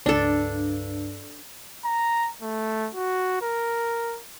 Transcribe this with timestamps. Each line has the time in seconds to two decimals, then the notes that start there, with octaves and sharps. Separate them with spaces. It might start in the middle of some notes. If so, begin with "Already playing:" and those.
0.06 C#2 G2 D4 A4
1.84 A#5
2.42 A3
2.95 F#4
3.42 A#4